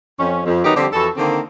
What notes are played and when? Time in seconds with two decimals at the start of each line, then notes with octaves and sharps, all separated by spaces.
0.19 F2 C#4
0.46 F2
0.65 D#3 E3 F#3 B3 D#4 G4
0.76 D3 F3 G3 C4 G4
0.93 F2 E3 F#4 A4
1.17 D3 D#3 A#3 C4